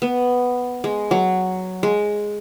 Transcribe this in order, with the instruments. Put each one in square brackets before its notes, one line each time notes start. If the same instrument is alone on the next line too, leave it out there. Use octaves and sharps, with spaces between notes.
[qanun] B3
G#3
F#3
G#3